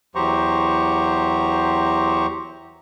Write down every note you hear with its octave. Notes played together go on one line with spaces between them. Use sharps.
E2 F#3 G4 C5 A#5 C#6